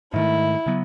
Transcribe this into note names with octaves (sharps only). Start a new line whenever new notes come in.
G#2 D#3 A3 E4
C#3 F#3 B3